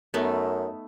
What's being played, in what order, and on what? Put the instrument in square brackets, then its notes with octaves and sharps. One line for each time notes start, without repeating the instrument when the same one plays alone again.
[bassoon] F#2 [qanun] A3 B3 D#4